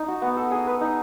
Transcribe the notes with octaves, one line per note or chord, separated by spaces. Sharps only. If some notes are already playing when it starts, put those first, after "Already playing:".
Already playing: D#4
F#4
B3
A4
G#4
B4
D#4